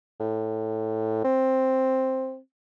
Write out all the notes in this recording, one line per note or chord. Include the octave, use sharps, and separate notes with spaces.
A2
C4